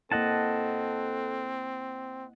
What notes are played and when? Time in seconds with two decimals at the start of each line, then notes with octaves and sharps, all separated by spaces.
0.12 A#3 C4 E4 A4 D#5 F#5 A5